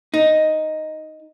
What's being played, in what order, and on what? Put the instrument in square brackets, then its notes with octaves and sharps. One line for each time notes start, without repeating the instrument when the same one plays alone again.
[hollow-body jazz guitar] D#4